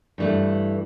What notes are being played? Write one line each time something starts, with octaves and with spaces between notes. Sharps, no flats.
G2 E3 A3